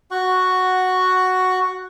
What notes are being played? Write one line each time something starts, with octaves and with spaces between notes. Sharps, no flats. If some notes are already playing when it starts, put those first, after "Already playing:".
F#4 F#5 C#6